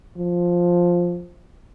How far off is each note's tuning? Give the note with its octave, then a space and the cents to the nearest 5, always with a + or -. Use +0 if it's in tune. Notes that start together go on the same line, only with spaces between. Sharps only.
F3 +5